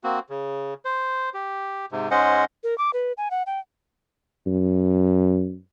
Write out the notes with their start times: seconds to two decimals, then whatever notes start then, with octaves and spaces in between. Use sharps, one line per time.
0.04 A#3 C4 F#4
0.30 C#3
0.85 C5
1.34 G4
1.92 G#2 C3
2.11 G#2 G#3 C#4 C5 D#5 F#5
2.64 A#4
2.78 D6
2.93 B4
3.17 G#5
3.31 F#5
3.46 G5
4.47 F#2